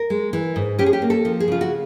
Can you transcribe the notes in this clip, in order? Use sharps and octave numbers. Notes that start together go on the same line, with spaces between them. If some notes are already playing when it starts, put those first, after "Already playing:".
Already playing: A#4
G#3
E3
G#2
C#4 G4
G#4
G4
A#3
A4
F3
G#4
C#3 F4
F#4